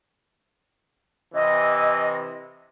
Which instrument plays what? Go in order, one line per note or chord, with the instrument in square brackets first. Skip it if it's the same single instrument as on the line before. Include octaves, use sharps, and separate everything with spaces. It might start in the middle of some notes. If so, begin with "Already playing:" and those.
[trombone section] C3 E3 [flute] D#5